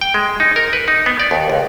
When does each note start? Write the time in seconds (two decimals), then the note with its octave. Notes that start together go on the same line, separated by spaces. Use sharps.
0.01 G5
0.14 G#3
0.40 D#4
0.56 A#4
0.73 B4
0.88 D#4
1.06 B3
1.19 D5
1.31 D#2
1.50 C#2